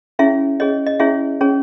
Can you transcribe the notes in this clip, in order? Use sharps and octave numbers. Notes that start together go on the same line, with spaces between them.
C#4 E4 G#4 C#5 E5
C#4 G#4 C#5 D#5
D#5
C#4 E4 G#4 C#5 E5
C#4 G#4 C#5